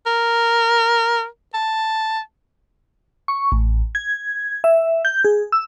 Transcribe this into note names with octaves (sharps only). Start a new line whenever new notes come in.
A#4
A5
C#6
A1
G#6
E5
G6
G#4
E6